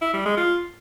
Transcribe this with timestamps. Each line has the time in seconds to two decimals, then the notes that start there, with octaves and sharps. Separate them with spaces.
0.02 E4
0.13 G3
0.25 G#3
0.37 F4